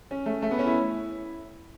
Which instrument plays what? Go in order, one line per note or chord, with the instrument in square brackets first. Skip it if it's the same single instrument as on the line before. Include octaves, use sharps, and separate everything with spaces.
[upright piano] C#4
A3
A3
B3
C#4
E4